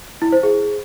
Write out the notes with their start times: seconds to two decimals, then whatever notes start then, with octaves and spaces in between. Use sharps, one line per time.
0.22 E4
0.32 C5
0.43 G#4